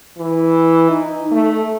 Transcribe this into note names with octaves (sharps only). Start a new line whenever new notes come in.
E3
D#4
A3